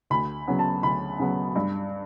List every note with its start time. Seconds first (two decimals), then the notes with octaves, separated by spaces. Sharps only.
0.10 D2 B5
0.47 C#3 F#3 B3
0.59 A5
0.83 D2 B5
1.19 C#3 F#3 B3
1.56 G2